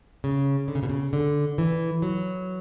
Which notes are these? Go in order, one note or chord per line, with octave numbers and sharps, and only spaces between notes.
C#3
D3
C#3
B2
C#3
D3
E3
F#3